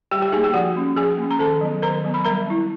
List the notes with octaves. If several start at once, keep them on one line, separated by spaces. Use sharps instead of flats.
G3 G4 G5
G4 G5
A#3 D#4 G#4 G#5
G4 G5
F3 F#4 F#5
A#3 C#4
F3 G#4 G#5
A#3 C#4
A#5
D#3 A4 A5
F#3 B3
D#3 A#4 A#5
F#3 B3
B5
G3 A#4 A#5
C4 E4